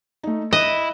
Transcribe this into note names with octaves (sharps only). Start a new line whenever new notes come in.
A3 D#4
E4 D#5 F#6